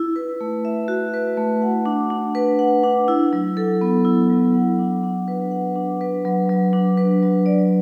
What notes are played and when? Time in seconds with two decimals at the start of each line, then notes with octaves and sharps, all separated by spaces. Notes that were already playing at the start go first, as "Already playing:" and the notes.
Already playing: E4
0.16 B4
0.41 A3
0.65 E5
0.88 F#4
1.14 B4
1.37 A3
1.62 F#5
1.86 D4
2.10 D4
2.35 B4
2.59 F#5
2.84 D4
3.08 E4
3.33 F#3
3.57 A4
3.81 B3
4.05 E4
4.30 F#3
4.54 F#5
4.79 D4
5.03 D4
5.28 B4
5.51 F#5
5.76 D4
6.01 B4
6.25 F#3
6.49 F#3
6.73 D4
6.98 B4
7.23 F#3
7.46 D5